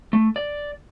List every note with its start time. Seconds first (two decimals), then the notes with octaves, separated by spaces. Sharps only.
0.13 A3
0.36 D5